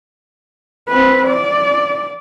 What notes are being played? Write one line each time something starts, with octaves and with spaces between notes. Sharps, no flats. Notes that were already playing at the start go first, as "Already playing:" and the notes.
C4 B4
D5